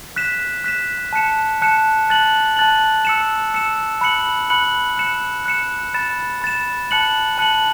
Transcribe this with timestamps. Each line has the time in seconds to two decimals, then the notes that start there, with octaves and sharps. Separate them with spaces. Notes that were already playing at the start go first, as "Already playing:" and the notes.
0.16 F#6 B6 E7
0.64 F#6 B6 E7
1.13 A5 F#6 C#7 E7
1.62 A5 F#6 C#7 E7
2.09 A5 F#6 A6 F#7
2.57 A5 F#6 A6 F#7
3.05 E6 C#7 E7
3.54 E6 C#7 E7
4.01 B5 F#6 C#7 F#7
4.50 B5 F#6 C#7 F#7
4.97 F#6 C#7 E7
5.46 F#6 C#7 E7
5.94 B5 A6 E7
6.42 B5 A6 E7
6.91 A5 F#6 C#7 F#7
7.38 A5 F#6 C#7 F#7